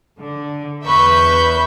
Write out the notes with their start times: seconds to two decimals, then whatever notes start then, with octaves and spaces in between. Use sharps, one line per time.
0.18 D3
0.84 E2 B4 E5 C#6 G6